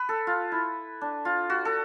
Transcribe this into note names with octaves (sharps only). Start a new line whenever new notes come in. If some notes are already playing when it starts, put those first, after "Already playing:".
Already playing: B4
A4
F4
E4
D4
F4
F#4
A4